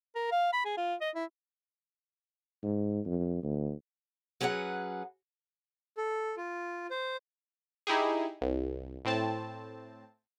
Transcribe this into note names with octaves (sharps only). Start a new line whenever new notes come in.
A#4
F5
B5
G#4
F4
D#5
E4
G#2
F2
D2
F#3 C#4 G#4 B4 F#5
A4
F4
C5
D#4 E4 G4 G#4
C2
A2 C4 A5